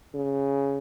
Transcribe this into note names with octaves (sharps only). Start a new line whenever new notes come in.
C#3